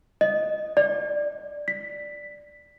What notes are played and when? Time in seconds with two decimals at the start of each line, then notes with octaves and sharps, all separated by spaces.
0.21 D#5
0.77 D5
1.68 B6